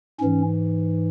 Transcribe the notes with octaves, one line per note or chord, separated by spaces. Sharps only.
G#2 E3 C#4